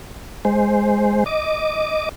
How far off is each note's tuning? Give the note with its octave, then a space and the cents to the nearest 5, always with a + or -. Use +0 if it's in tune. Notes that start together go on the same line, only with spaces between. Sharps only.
G#3 +0 C5 +0
D#5 +0 D6 +0